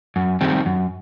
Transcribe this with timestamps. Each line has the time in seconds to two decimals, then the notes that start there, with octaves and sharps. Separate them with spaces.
0.16 F#2
0.41 D#3 G3 C4
0.66 F#2